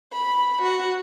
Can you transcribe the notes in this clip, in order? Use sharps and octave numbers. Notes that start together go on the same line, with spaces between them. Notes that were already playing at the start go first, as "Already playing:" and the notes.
B5
F#4